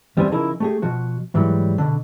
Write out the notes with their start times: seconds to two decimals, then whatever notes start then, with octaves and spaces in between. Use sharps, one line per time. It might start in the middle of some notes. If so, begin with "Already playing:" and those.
0.17 E2 G3 B3 C4 C5 G#5
0.31 C#3 F3 D#4 E4 G#4 A#4
0.60 A3 G4 G#4
0.82 B2 F3 F#4
1.34 G#2 E3 F#3 G3
1.78 B2 D3